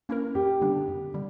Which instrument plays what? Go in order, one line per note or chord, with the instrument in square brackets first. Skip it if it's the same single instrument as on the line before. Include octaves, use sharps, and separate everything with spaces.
[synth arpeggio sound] A#3 C#4 E4 A#4
[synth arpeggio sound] F#2 [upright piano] G4
[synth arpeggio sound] D3 G3 B3 D4
F#2
D3 G3